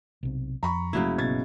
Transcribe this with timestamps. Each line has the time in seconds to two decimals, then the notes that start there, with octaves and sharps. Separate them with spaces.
0.23 B1 C3
0.63 F2 A#5 B5 C#6
0.93 G1 C#3 F#3 A3 A#3 E4
1.18 B2 G#6 A6